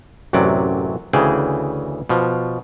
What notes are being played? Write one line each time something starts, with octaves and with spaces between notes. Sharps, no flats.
A1 F#2 C3 F#3 D5
D2 C#3 E3 G#4 G5
B2 F3